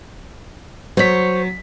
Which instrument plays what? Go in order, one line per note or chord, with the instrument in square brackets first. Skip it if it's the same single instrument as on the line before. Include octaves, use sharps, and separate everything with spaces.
[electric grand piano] F#3 B6 [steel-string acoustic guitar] C5 C#5